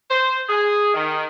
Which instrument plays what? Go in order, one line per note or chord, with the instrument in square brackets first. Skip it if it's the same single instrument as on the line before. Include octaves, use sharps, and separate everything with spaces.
[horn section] C5
G#4
D#3